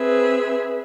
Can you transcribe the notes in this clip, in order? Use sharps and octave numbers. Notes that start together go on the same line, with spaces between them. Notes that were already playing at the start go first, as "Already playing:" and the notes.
Already playing: C4 G#4 B4 E5